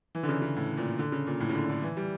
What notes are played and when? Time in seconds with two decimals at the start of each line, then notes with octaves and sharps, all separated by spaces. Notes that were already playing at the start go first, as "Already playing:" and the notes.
0.15 E3
0.23 D3
0.29 C#3
0.42 C#3
0.56 A2
0.77 A#2
0.99 D3
1.12 C#3
1.27 A#2
1.40 A2
1.50 C#3
1.55 D3
1.69 D3
1.83 E3
1.97 G3